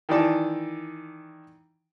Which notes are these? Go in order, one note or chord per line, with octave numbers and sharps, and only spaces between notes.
D#3 E3 D5 A5